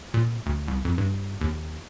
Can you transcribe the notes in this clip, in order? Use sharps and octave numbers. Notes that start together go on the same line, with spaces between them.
A#2
D2
C2
F2
G2
D#2